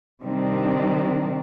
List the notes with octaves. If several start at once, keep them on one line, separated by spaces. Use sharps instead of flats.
C3 D#3 G3 C4 D4